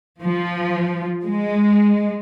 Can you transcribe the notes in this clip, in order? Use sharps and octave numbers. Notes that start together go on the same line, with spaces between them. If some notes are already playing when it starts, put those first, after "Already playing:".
F3
G#3